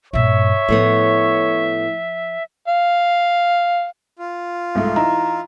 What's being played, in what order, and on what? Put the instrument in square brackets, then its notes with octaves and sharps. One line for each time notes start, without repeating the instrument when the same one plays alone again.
[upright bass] G2 A#2 [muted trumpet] C#5 [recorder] E5
[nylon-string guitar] A2 A3 B3 [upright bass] F3
[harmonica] F5
[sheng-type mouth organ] F4
[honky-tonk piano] C2 G#2 A3
[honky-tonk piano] E3 D#4 E4 [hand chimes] A#5